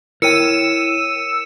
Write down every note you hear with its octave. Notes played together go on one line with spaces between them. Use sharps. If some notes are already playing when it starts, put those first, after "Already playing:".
E4 A#4 C#5 G5 E6 C#7 D#7